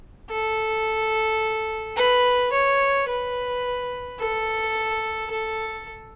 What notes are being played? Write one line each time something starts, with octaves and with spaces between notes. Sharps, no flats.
A4
B4
C#5
B4
A4
A4